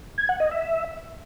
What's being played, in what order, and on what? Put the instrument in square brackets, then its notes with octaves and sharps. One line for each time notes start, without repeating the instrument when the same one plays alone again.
[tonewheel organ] G#6
F#5
D#5
E5